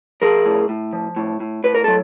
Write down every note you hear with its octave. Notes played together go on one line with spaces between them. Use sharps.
F3 G#4 A#4
A2
A2
F3
A2
A2
A2 B4
A#4
F#3 A4